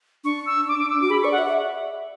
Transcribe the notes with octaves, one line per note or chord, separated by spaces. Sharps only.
D4 C#6
E6
D6
D6
E6
F#4 D6
G#4 B5
C#6
D5
F#5
E5